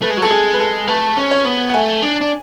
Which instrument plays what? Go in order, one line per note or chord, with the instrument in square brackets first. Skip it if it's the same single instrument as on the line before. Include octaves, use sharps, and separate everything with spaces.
[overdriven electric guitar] A3 [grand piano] B4
[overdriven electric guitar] G#3
F#3
[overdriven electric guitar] G#3 [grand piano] A4
[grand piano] G#4
B4
A4
[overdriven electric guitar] A3 [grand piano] B4
[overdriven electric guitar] C#4
[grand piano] C#5
[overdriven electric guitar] B3
[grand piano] F#5
[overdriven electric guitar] A3 [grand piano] G#5
[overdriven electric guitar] D4
D4